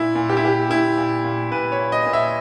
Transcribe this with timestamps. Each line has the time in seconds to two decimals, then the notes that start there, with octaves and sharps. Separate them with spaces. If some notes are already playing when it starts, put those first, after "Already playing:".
Already playing: A#2 E4
0.15 A#2
0.29 G4
0.37 E4
0.43 A#2 G4
0.70 A#2 E4
0.97 A#2
1.24 A#2
1.51 A#2 B4
1.72 C#5
1.79 A#2
1.92 D#5
2.06 A#2
2.13 E5